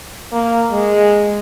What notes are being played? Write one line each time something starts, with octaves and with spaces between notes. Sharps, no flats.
A#3
G#3